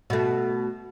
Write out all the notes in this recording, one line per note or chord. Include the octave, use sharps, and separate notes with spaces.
B2 A3